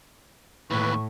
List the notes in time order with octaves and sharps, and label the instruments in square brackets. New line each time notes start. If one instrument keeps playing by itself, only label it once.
[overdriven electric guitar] D#2 E3 [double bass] A2 [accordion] B4 [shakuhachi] C#6